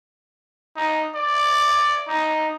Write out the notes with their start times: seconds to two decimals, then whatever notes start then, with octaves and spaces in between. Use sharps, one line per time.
0.76 D#4
1.15 D5
2.08 D#4